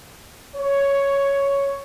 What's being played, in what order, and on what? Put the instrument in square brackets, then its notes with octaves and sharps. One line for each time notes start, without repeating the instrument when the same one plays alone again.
[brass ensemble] C#5